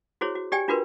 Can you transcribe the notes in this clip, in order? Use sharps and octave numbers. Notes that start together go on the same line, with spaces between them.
E4 F#4 G#4 C5 C#5
F#4
G4 D5 G5 G#5
D4 F4 F#4 A#4 B4 C6